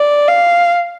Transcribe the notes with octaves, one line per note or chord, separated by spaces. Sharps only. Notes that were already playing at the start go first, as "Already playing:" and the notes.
Already playing: D5
F5